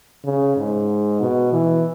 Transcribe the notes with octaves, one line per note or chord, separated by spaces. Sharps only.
C#3
G#2
B2
E3